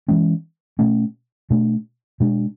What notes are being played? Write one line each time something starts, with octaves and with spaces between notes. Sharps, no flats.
E3 G#3 C#4
B2 A3 C#4
B2 A3 D4
B2 G#3 D4